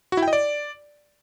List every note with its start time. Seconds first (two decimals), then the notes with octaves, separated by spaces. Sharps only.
0.12 F#4
0.17 E4
0.22 G5
0.28 D#5
0.33 D5